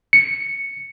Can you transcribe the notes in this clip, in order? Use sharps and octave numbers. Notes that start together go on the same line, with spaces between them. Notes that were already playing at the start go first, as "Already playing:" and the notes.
C#7